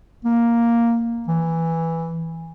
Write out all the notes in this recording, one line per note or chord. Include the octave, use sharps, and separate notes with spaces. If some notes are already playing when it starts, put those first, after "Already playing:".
A#3
E3